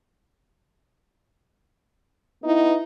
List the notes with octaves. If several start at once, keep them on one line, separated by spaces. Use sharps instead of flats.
B3 D#4 E4